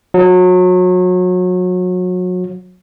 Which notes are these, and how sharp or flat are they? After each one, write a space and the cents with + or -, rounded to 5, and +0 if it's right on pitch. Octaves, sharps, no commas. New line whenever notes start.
F#3 -30